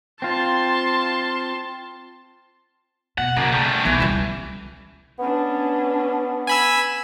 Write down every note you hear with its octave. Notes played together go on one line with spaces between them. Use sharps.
C4 F4 A5 C6
B2 F#5
C#3 F#3 A#3
G3 A3
B1 E3 B3
C#2 G3
B3 C#4 D4
G#5 B5 E6